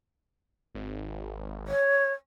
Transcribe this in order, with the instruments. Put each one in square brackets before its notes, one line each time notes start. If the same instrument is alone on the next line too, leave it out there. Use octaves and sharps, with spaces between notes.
[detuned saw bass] G#1
[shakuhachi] C#5